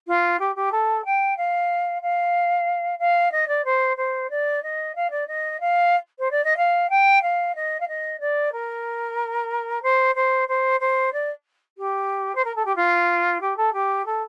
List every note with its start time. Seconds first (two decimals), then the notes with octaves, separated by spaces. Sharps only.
0.07 F4
0.39 G4
0.55 G4
0.72 A4
1.05 G5
1.37 F5
2.02 F5
2.99 F5
3.31 D#5
3.47 D5
3.64 C5
3.97 C5
4.30 D5
4.62 D#5
4.95 F5
5.10 D5
5.27 D#5
5.60 F5
6.19 C5
6.31 D5
6.44 D#5
6.57 F5
6.89 G5
7.22 F5
7.55 D#5
7.80 F5
7.88 D#5
8.20 D5
8.52 A#4
9.82 C5
10.15 C5
10.48 C5
10.80 C5
11.12 D5
11.78 G4
12.35 C5
12.44 A#4
12.55 A4
12.65 G4
12.75 F4
13.41 G4
13.56 A4
13.73 G4
14.05 A4